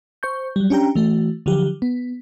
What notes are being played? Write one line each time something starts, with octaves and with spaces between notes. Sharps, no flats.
C5 C#6 G6
F#3 G3
C#4 D4 G4 G5 A#5
E3 A3 F#4
D3 F3 F#3 G4
B3